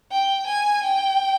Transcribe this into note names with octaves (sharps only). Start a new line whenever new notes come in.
G5
G#5
G5